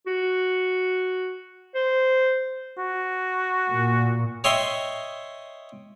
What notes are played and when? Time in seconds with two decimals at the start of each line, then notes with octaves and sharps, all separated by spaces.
0.07 F#4
1.75 C5
2.78 F#4
3.68 A#2
4.44 C#5 D#5 E5 G5 C6